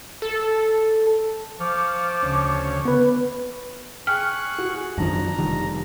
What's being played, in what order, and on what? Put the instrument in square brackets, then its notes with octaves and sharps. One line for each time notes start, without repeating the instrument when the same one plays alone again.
[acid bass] A4
[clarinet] F3 [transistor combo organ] F5 C#6 [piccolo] D6
[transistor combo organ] D2 C#3 C#5
[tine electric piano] B3 B4
[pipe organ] G#4 C#6 F#6 [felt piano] G5 [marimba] F6
[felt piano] F#4
[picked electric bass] F#2 D#3 F3 [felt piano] D4 [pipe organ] A#5
[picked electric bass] F1 D#3 G3